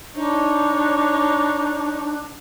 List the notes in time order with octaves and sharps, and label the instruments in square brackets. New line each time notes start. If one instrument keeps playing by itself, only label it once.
[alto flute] D4 [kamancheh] D#4 C#5